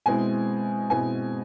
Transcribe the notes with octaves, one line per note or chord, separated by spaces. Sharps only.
B2 G#3 C4 E4 G#5
B2 G#3 C4 E4 G#5